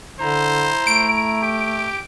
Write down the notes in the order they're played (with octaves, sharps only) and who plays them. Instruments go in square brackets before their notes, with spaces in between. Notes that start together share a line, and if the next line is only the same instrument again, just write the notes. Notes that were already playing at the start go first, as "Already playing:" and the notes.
[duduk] D3 [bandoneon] E4 A#5 [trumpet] C5
[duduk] A3 [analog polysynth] D7
[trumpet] G4